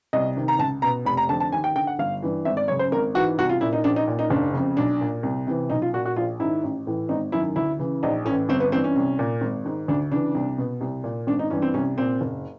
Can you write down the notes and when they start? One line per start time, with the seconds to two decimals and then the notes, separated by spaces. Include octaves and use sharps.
0.13 C2 D#5
0.36 C3 D#3
0.48 A#5
0.59 C#2 A5
0.82 B2 A#5
1.05 F1 B5
1.17 A#5
1.29 F2 D3 A5
1.40 A5
1.52 D#2 G#5
1.64 G5
1.75 D3 G5
1.87 F#5
1.99 G1 F5
2.23 G2 E3
2.45 G#1 E5
2.57 D5
2.68 F#2 C#5
2.71 C#3
2.79 C5
2.92 G#1 A#4
3.14 G#2 E3 F#4
3.38 C2 F#4
3.49 F4
3.61 A#2 E4
3.73 D#4
3.84 A#1 D4
3.96 D#4
4.08 A#2
4.19 D#4
4.30 F#1 D4
4.54 F2 C#3
4.77 B1 D4
5.01 A#2
5.23 C2
5.47 C3 E3
5.70 B1 D#4
5.82 F4
5.94 A#2 F#4
6.06 F#4
6.16 A#1 F4
6.40 G#2 D#3 E4
6.64 A1
6.87 A2 E3
7.09 G#1 D#4
7.32 F#2 D#3 E4
7.56 D2 E4
7.79 C#3 E3
8.03 A#1 D#4
8.25 A2 C#4
8.30 E3
8.49 G1 C4
8.60 B3
8.72 G2 E3 C4
8.84 C#4
8.96 C2
9.19 A#2
9.41 G#1
9.65 G#2 D#3
9.88 D2 D4
10.11 C#3 E3 D4
10.35 C2
10.58 B2
10.81 C2
11.04 A#2
11.27 G#1 D4
11.39 D#4
11.50 G2 E3 C#4
11.62 C4
11.74 C2 C#4
11.98 A#2 C4
12.21 F#1